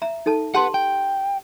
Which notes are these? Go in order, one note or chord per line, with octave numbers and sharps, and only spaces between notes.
E5 A#5
D#4 A4 A5
G4 B4 F#5 A5 C6
G5